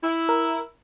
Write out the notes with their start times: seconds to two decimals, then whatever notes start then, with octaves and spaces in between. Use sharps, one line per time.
0.03 E4
0.29 A#4